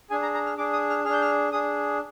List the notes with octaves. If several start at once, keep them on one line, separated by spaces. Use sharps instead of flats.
D4 G#4 G#5
A#5
A#5
F6
D4 G#4 D6
D#6
F6
D4 G#4 F6
G6
F6
D4 G#4 D#6